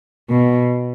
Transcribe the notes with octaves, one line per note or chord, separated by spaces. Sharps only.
B2